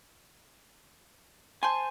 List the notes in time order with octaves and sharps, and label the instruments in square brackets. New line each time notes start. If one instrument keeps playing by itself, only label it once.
[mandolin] C5 A5 C6 [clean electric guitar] G#5